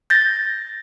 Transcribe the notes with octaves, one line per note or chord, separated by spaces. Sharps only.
G6 A6 A#6